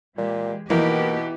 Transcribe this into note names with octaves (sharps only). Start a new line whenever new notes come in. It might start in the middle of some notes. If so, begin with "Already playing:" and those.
A#2 E3 G#3 G4
B2 E3 A#3 B3 D#4 G4